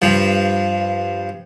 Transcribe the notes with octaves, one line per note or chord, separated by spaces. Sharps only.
G2 F3